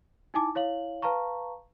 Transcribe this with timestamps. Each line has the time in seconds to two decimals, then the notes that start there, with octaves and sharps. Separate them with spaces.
0.34 D#4 E4 G#5 A5 D6
0.55 E4 C#5 F5 F#7
1.02 B4 F5 A5 A#5 C#6